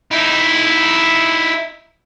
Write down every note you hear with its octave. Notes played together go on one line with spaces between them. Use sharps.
D#4 E4